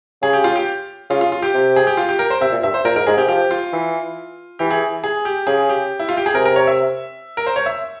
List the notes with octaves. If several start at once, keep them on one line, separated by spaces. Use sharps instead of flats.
C#3 G#4
G4
F4
G4
C#3 F4
F4
F4
G4
C3
G#4
G4
F4
G4
A#4
C5
C3 E5
A#2
G2 E5
C5
A#2 A#4
G#2 A#4
G#2 G#4
C3 G4
F3 G4
F4
E3
E3 G4
G#4
G#4
G4
C#3 G#4
G4
E4
F4
G4
G#4
C3 A#4
A#4
C#5
E5
A#4
C5
C#5
E5